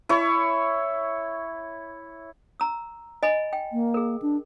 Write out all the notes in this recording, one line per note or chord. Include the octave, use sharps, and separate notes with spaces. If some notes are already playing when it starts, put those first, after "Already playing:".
E4 C#5
A#5 E6
D#5 G#5 B5
G5
A#3
G#4 A#4
D4